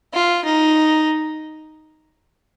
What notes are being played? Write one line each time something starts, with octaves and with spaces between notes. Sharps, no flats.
F4
D#4